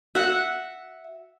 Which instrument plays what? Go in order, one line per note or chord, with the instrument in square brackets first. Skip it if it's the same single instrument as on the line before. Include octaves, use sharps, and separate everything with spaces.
[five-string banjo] F#4 [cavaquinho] E5 F#5